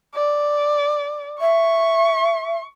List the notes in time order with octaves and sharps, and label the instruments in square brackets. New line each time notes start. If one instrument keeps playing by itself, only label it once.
[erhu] D5
[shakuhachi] E5 [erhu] C#6